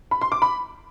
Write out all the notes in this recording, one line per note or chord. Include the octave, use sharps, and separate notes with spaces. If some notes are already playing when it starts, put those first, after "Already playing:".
B5
C6
D6
B5